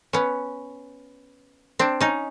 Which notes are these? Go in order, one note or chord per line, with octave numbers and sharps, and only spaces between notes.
B3 C#4
C4 D4
C#4 D#4